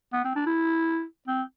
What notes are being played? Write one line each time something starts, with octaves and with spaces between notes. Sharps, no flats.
B3
C4
D4
E4
C4